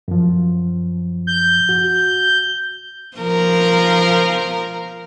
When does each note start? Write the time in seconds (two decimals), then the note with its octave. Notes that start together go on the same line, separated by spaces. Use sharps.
0.08 F#2 F3
1.27 G6
1.69 F#4
3.18 F3 A#4